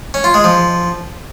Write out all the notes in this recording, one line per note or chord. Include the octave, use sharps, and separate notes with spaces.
C#4
F4
G#3
F3